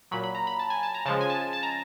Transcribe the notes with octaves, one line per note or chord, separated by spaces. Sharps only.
A#2 F#3 B5
B5
A#5
B5
A5
G#5
A5
A#5
C#3 F3 G#3 A5
G#5
A5
A5
A#5